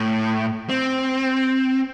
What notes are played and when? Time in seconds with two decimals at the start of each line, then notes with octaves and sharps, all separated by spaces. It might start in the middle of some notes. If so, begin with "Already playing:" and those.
Already playing: A2
0.69 C4